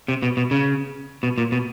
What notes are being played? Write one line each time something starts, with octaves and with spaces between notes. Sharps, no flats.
C3
B2
B2
C#3
B2
A#2
B2